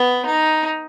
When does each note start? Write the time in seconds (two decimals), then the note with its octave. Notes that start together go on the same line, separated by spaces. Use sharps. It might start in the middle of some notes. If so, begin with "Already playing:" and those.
Already playing: B3
0.25 D#4